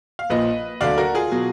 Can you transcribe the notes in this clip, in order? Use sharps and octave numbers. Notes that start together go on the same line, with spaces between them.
F5
A#1 A#2 F3 B4 D#5
D2 D3 F#3 D5 F5
F#4 A#4
F4 G#4
B2 F#3